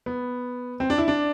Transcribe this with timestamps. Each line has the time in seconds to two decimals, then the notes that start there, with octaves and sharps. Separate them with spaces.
0.06 B3
0.80 C4
0.90 D4
0.98 E4
1.08 D4